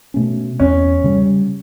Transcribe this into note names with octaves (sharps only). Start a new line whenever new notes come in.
B2 A3 C#4
E2 C#4
C#3 G3